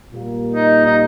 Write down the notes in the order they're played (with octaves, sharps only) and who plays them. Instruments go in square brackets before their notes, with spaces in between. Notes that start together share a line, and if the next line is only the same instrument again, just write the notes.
[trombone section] A#2 G3 A#3
[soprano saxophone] D#4
D#4